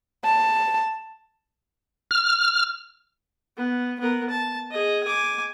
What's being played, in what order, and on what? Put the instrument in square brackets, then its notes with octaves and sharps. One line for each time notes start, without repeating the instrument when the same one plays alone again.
[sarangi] A5
[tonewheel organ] F6
[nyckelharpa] B3
B3 A#4
A5
G#4 D#5
G#5 D6